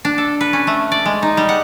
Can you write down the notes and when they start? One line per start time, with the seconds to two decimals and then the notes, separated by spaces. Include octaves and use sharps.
0.05 D4
0.18 A4
0.41 B4
0.53 C#4
0.67 A3
0.92 D5
1.05 G#3
1.22 D#4
1.37 G3
1.49 F#5